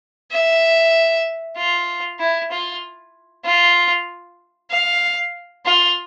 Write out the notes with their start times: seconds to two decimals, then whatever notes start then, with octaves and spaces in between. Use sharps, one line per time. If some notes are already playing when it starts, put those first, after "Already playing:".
0.32 E5
1.57 F4
2.20 E4
2.51 F4
3.45 F4
4.71 F5
5.66 F4